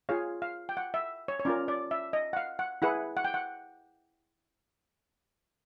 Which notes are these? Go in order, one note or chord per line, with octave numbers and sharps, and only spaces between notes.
F4 G#4 C#5 F5
F5
G5
F#5
E5
C#5
C#5
C#4 F4 A#4 D5
D5
E5
D#5
F#5
F5
F#5
E4 G#4 B4 F#5
F#5
G5
F#5